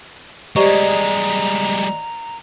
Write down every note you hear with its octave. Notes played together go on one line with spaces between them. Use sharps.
G3 G#3 G4 C5 D5 D#5 A#5 C#6